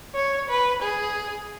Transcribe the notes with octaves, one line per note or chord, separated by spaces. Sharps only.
C#5
B4
G#4